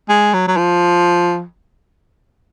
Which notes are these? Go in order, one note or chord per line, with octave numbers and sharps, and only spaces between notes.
G#3
F#3
F#3
F3